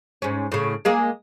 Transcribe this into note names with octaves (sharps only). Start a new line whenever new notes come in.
G#2 C#4
A2 C#3
G#3 A#3 G#4